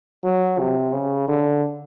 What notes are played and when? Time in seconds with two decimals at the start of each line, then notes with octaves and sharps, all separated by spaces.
0.24 F#3
0.59 C3
0.93 C#3
1.28 D3